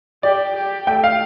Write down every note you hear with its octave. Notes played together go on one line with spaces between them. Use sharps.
G4 D5
G4
A3 G5
F5